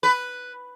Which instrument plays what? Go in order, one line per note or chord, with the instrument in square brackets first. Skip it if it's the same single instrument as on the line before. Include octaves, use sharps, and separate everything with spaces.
[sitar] B4